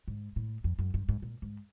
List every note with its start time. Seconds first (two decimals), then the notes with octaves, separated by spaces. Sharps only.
0.08 G#2
0.36 A2
0.64 F2
0.79 F#2
0.94 G2
1.09 G#2
1.22 A#2
1.42 G#2